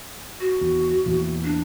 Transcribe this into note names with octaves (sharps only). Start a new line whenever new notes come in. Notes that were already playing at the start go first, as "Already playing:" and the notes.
F#4
E2
E2 A#2 E3
D4